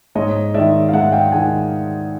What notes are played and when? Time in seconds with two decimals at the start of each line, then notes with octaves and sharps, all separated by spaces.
0.15 G#2 C#5 D#5
0.54 D#3 G#3 D5 E5
0.89 F5
0.93 G#2 E5 F#5
1.12 F5 G5
1.32 D#3 G#3 F#5 G#5